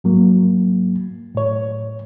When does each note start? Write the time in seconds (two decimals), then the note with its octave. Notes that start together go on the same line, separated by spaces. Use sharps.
0.04 G#2 F#3 A#3
1.35 A2 C#5